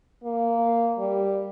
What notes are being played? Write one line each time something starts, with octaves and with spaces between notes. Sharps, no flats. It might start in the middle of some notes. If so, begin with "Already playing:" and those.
A#3
G3